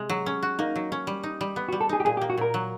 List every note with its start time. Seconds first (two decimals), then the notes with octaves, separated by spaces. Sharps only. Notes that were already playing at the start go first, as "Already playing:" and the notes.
Already playing: C3 G#3
0.09 F#3
0.26 C#4
0.43 F#4
0.59 A#3 D#4
0.76 F#3
0.92 C#4
1.07 G3
1.24 D#4
1.41 G3
1.56 B3
1.69 F#4
1.72 G3
1.81 A4
1.89 D#4 G#4
2.00 G4
2.05 A#2 G#4
2.17 G4
2.21 A#3
2.30 F#4
2.38 A#2 A#4
2.54 F#3